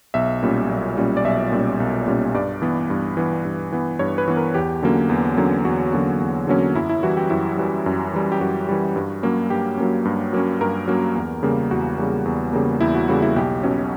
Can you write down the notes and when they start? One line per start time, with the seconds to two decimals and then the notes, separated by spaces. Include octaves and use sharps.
0.14 B1 E5
0.43 A#2 G3 C#4
0.69 B1
0.97 A#2 G3 C#4
1.17 D5
1.24 B1 E5
1.52 A#2 G3 C#4
1.80 B1
2.07 A#2 G3 C#4
2.34 G2 D5
2.62 E3 B3
2.90 G2
3.17 E3 B3
3.45 G2
3.72 E3 B3
3.99 G2 C#5
4.18 B4
4.28 E3 B3
4.37 A#4
4.55 E2 G4
4.83 D3 F#3 A#3 C#4
5.09 E2
5.37 D3 F#3 A#3 C#4
5.65 E2 F#4
5.93 D3 F#3 A#3 C#4
6.20 E2
6.47 D3 F#3 A#3 C#4
6.75 F#2 E4
6.89 E4
7.03 E3 G3 F#4
7.17 G4
7.30 F#2 E4
7.57 E3 G3
7.86 F#2
8.13 E3 G3
8.32 G4
8.40 F#2 F#4
8.69 E3 G3
8.96 G2
9.23 F#3 A#3 C#4
9.50 G2 G4
9.77 F#3 A#3 C#4
10.05 G2
10.33 F#3 A#3 C#4
10.61 G2 A#4
10.88 F#3 A#3 C#4
11.15 E2
11.43 C#3 G3 A#3
11.71 E2 F#4
11.98 C#3 G3 A#3
12.25 E2
12.53 C#3 G3 A#3
12.81 E2 E4
12.95 F#4
13.08 C#3 G3 A#3 F#4
13.22 E4
13.36 B1 G4
13.63 B2 F#3 C#4